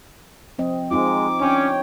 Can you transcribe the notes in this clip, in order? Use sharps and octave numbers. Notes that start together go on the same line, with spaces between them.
F3 C4 D#5
G#3 C4 D#4 F4 D6
C#4 D4 C#5 G5